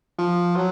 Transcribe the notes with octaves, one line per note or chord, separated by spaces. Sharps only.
F3
F#3